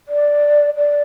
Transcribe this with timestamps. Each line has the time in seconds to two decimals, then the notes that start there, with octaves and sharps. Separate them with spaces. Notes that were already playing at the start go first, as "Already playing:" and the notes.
0.08 D5
0.77 D5